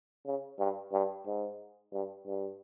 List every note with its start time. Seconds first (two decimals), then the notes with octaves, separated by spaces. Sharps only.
0.26 C#3
0.59 G2
0.92 G2
1.26 G#2
1.93 G2
2.27 G2